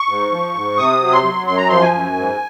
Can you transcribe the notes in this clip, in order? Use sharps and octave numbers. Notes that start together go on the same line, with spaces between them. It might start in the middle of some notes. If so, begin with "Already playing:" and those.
Already playing: C#6
G#2
F3
G#2
C3 D#6
F#3
C6
F#3
F#2 C6
A#5
F3 C6
G#5
F#2
G#2